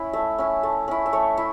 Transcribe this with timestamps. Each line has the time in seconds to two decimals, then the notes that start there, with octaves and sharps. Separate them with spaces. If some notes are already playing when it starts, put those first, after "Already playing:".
Already playing: C#4 E4
0.13 A3 E5
0.39 C#4 E4
0.63 A3
0.88 C#4 E4
1.06 E5
1.13 A3 C#5
1.37 E4 E5